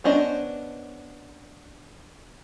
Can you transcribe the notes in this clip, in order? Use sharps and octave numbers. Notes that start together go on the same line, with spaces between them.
B3 C#4 D4 C5 D#5